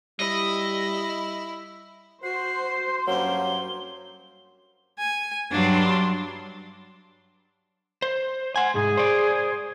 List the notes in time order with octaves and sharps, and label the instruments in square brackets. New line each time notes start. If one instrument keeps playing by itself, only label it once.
[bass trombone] G3 [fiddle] E4 [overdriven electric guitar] D#5
[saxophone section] F#4 [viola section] C5 [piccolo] C7
[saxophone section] G2 A#3 C#4 [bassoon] F#3 [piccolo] G7
[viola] G#5
[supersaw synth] G2 C6 [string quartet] F#3 [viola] D4
[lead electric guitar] C5
[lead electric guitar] C5 G#5 [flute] F#5
[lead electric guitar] C2 G#2 [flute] G#4
[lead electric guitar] C5 D5